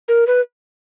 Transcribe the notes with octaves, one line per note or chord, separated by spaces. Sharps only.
A#4
B4